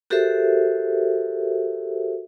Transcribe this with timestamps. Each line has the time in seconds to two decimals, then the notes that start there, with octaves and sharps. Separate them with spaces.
0.10 F#4 G4 A4 A#4 C5 E5